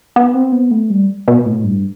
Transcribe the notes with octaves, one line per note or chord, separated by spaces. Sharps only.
B3
C4
B3
A3
G3
B2
A2
G2